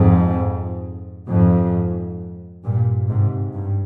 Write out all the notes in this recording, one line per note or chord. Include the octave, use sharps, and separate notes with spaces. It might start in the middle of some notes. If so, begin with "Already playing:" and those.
Already playing: F2 G#2
F2 G#2
G2 A#2
G#2 C3
G2